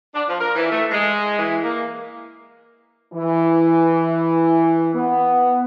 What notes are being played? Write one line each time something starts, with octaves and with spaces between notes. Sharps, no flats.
D4
F3
A#4
E3
A3
G#3
E3
A#3
E3
B3